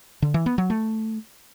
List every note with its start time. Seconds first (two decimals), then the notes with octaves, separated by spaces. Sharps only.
0.22 D3
0.34 E3
0.46 B3
0.58 F#3
0.70 A3